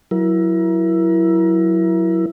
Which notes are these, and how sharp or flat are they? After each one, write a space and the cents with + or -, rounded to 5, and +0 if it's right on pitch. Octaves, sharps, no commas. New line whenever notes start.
F#3 +0 E4 +10 A#4 +30